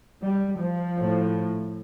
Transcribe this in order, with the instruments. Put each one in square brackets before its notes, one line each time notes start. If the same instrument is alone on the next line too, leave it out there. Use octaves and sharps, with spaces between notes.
[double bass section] G3
F3
A2